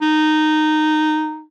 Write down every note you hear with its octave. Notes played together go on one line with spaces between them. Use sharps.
D#4